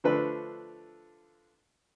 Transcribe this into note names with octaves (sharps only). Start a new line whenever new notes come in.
D3 F3 A3 D4 B4